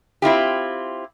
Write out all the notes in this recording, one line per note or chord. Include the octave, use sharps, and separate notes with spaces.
C4 E4 F4 G4